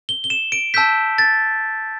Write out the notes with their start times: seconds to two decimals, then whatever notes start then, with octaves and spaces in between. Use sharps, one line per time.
0.09 G7
0.24 G7
0.30 E7
0.52 D7
0.74 A5 E6 G6 B6
1.18 A6